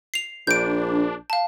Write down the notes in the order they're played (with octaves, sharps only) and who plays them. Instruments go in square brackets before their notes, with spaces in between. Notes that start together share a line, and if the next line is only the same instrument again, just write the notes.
[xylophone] C7 F7
[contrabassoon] A#1 [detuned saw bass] D4 [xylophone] G6 D7
[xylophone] F5 A5